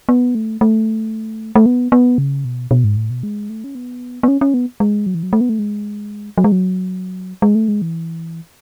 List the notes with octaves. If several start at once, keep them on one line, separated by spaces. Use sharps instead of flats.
B3
A3
A3
A3
B3
B3
C#3
B2
B2
G#2
A2
B2
G#3
A3
C#4
B3
B3
C#4
C#4
B3
G#3
F#3
E3
F#3
A3
B3
A3
G#3
F#3
G#3
F#3
G#3
A3
G#3
E3